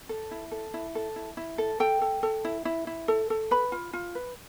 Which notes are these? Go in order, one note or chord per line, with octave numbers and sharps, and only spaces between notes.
A4
E4
A4
E4
A4
E4
E4
A4
A4 G5
A4
A4
E4
E4
E4
A4
A4
B4 B5
F4
F4
B4